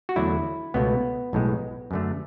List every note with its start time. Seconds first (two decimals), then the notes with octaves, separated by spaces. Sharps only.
0.09 F#4
0.16 E2 D3 F#3 A3 E4
0.74 C#2 B2 A3 B3
1.33 B1 A2 G#3
1.91 F#2 D3 A3